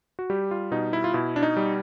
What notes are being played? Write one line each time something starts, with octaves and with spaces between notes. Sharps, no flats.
F#4
G3 G4
F4
B2 D#4
E4
F4
B2 E4
D4
D#4
G3